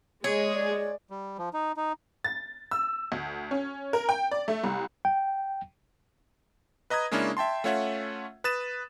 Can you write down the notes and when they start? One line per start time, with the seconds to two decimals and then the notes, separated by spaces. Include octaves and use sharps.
0.24 G#3 G#4 C#5
0.54 D5
1.10 G3
1.38 F3
1.54 D#4
1.77 D#4
2.24 A6
2.71 E6
3.12 D2
3.51 C#4
3.93 A#4
4.09 G5
4.31 D5
4.48 A3
4.64 C2
5.05 G5
6.90 B4 D#5 A#5 D#6 G#6
7.11 C#3 G#3 A#3 C#4 D4 E4
7.37 E5 G5 A5 C6
7.64 A3 C#4 F4 C#5 E5 F#5
8.44 B4 D#6 A6 E7